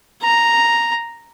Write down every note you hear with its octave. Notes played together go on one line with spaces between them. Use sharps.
A#5